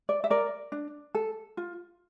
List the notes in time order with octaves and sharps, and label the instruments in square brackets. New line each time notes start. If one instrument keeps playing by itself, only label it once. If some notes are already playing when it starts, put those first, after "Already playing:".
[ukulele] D5
E5
A#4 D5
D4
A4
F4